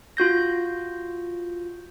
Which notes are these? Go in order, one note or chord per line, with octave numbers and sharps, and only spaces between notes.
F4 F#4 G6 A#6